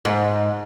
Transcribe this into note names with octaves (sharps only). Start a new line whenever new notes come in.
G#2